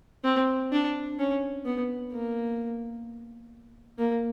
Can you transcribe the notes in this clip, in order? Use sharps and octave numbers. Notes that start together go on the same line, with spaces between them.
C4
D4
C#4
B3
A#3
A#3